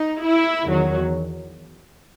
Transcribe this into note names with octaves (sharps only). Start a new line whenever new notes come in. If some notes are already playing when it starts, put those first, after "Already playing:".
Already playing: D#4
E4
E2 D#3 F#3